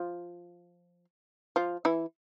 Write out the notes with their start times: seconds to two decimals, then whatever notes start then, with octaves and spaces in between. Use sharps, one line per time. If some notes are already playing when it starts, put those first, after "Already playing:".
Already playing: F3 F4
1.56 F3 F4
1.85 E3 E4